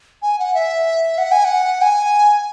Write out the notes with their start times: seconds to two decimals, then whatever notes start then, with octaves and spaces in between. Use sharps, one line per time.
0.22 G#5
0.39 F#5
0.54 E5
1.18 F#5
1.32 G#5
1.45 F#5
1.82 G#5